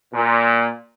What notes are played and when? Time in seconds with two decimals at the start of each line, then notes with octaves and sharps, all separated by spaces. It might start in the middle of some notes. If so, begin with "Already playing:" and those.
0.14 A#2